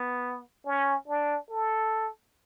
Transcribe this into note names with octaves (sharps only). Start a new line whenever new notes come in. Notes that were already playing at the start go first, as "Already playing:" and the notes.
Already playing: B3
C#4
D4
A4